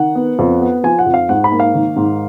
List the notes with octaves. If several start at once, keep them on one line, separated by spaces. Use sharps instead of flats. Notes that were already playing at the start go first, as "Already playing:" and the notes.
Already playing: D#3 F#5
B3
F2
B3
F3 G#5
F#5
F2
F5
G#2 F#5
B5
A#3
F5
D#3
G#2